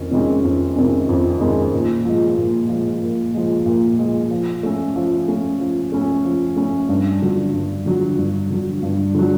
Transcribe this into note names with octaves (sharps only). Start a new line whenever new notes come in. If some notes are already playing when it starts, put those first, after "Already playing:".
Already playing: F2 D#3 C#4
C3 D#3 G#3 C#4
F2
C3 D#3 G#3 C#4
F2
C3 D#3 G#3 C#4
A#2
F3 G#3
A#2
F3 G#3
A#2
F3 G#3
A#2
F3 G#3
F3
A3 C#4
F3
A3 C#4
F3
A3 C#4
F3
A3 C#4
G2
D3 F#3
G2
D3 F#3
G2
D3 F#3
G2
D3 F#3